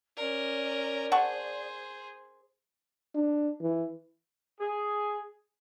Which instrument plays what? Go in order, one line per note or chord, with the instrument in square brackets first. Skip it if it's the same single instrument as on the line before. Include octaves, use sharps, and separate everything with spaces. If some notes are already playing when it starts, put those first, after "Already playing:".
[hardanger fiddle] C#4 A#4 [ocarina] D5
[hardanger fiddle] G#4 C5 [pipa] F#5 A5 C#6
[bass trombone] D4
E3
[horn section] G#4